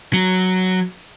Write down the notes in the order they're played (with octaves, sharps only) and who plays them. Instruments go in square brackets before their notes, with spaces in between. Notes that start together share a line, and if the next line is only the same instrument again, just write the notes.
[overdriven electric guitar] F#3